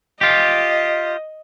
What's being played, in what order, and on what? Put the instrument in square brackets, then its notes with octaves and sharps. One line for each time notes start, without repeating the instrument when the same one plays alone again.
[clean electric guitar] F4 G4 [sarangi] D#5